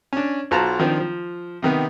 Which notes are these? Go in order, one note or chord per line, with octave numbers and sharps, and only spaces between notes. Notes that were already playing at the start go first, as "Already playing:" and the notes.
C#4 D4
B1 F4 F#4 C5 A5 A#5
D#3 F3 C4 D4
F3
C3 D#3 B3